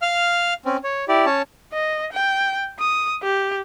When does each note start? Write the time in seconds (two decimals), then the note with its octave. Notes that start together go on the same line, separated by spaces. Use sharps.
0.02 F5 F6
0.65 C4 C#4
0.84 C#5
1.08 E4 G4 D5
1.26 C#4 C#5 A5
1.73 D#5
2.13 G5
2.80 D#6
3.23 G4